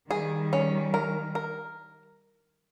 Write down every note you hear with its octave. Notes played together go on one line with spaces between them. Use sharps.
D#3 G3 G#4
C#4
A#4
A#4